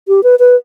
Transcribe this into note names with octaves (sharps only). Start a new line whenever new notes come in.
G4
B4
B4